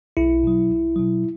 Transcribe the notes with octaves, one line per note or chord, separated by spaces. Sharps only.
B1 E4
B2 F#3
B1
B2 F#3